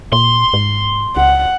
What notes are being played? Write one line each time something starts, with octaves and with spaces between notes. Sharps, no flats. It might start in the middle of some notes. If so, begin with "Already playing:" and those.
A#2 C6
G#2
C#2 F#5